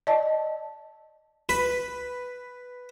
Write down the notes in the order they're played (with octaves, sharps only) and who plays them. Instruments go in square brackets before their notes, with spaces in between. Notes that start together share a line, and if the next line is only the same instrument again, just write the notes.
[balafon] D5 D#5 A5
[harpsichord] B4